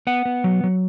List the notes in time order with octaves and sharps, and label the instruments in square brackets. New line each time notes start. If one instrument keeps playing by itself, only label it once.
[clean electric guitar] B3 F#5
B3
F#3
F#3